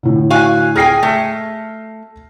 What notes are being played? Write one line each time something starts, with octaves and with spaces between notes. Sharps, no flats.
A2 D3
F#4 F5 G#5
G#4 G5 G#5 F6 A#6 C7
A3